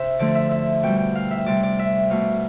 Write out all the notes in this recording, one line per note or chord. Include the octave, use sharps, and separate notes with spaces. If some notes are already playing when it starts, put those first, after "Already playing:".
Already playing: C3 C5 E5
D3 F3 A3 D5
E5
E5
B2 G3 G5
G5
F5
E5
C3 G3 D5
D5
E5
B2 A3 F5